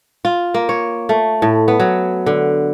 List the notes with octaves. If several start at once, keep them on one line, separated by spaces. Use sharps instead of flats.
F4
A#3
C#5
A3
A2
B3
F#3
D3